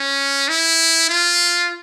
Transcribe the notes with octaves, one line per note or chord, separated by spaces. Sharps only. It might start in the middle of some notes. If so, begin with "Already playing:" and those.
Already playing: C#4
E4
F4